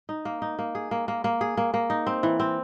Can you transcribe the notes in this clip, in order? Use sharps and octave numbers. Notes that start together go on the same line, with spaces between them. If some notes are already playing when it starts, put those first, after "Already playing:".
D#4
A#3
D#4
A#3
G#4
A#3
A#3
A#3
G#4
A#3
A#3
D#4
C4
E3
C4